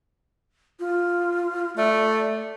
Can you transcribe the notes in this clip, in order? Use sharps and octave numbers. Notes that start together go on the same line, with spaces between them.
F4
A3 D5